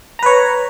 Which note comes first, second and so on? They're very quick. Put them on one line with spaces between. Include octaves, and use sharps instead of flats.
A#5 B4 C#5